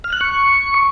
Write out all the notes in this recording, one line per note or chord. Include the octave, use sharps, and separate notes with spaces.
F6
F#6
C#6